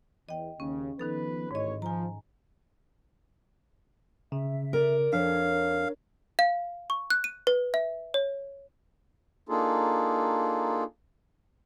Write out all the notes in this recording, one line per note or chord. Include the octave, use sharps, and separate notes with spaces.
E2 D#5 G5
D#2 C#3 C#4
D#3 F3 B3 D#4 A4 B4
A1 G#2 C#5 D#5
F3 G#5 A#5
C#3 E5
A#4 D5
F2 D4 A#4 C#5 F5
F5
C#6
F#6
D#7
B4
E5
C#5
A#3 D4 D#4 F4 G#4 A4